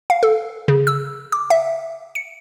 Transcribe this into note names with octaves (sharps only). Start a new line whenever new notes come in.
F5
A4
C#3
E6
D6
E5
C#7